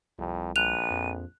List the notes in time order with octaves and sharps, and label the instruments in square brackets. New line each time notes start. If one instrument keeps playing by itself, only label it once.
[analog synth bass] C2 [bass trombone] F2
[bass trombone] A#1 [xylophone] F#6 F7 [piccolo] D#7
[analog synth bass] F2